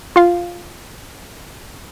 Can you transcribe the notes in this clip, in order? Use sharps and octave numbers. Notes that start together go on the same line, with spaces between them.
F4 F5